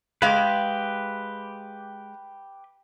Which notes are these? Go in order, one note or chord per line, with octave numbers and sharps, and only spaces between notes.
G#3 G4 B4 F5